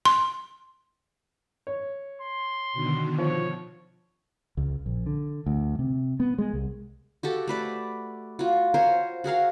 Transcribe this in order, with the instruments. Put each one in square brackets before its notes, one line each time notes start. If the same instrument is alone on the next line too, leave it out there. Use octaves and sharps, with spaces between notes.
[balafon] C6
[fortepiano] C#5
[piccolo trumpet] C6
[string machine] B2 D3 D#3
[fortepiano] F3 [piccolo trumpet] C#5
[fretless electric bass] C#2
A#1
D3
D2
C3
B3
G#3
C2
[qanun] F#4 G4 A4
A3 B4 D5
F4 F#4
A#4 C5 C#5 G#5
F#4 G#4 A#4 F5